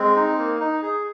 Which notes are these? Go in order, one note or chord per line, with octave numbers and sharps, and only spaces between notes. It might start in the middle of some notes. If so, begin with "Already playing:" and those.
Already playing: G#3 C4
D#4
A#3
D#4
G#4